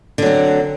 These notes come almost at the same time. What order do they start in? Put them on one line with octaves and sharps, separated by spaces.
D3 F#3 C4